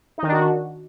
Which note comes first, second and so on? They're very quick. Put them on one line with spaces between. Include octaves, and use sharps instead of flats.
D#4 D#3 D4 F#4